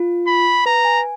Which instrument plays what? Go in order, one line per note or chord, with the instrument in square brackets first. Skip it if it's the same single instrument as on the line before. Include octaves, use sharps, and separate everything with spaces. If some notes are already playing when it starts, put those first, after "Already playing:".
Already playing: [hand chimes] F4
[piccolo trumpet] B5
[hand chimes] B4 [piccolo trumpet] A#5
[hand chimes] G#5